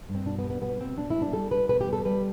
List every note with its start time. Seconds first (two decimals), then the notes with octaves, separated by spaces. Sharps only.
0.09 G2
0.15 C4
0.26 B2 D4
0.39 B3
0.44 G3
0.50 B3
0.62 B2 B3
0.80 B2 C4
0.97 B2 D4
1.10 E4
1.16 G3
1.22 D4
1.33 G3 A4
1.51 G3 B4
1.69 B2 B4
1.81 G4
1.87 G3
1.93 A4
2.05 G3 B4